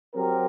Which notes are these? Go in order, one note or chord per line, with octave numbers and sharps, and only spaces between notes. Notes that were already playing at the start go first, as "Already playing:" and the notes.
F#3 C4 G4 A#4